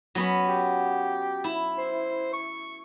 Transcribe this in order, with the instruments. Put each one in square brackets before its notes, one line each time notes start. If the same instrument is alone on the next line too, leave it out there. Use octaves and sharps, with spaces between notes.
[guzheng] F#3 B3 C#4
[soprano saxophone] G4
[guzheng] E4
[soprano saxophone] C5
C#6